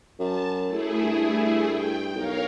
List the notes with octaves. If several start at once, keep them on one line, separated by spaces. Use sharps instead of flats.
F#2 A5
A3 E4 G#4
G2
G5
B1 A#4 C#5 F5